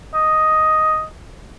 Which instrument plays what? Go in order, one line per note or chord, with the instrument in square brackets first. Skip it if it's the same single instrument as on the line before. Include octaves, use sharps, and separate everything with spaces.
[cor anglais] D#5